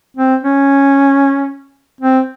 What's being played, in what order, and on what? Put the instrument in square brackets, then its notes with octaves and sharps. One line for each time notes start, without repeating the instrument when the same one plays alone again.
[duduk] C4
C#4
C4